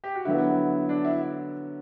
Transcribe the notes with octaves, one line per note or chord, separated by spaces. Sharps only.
G4
F#4
D3 F#3 B3 E4
D4
E4